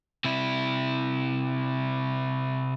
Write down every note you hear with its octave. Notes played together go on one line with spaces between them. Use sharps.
C3 E4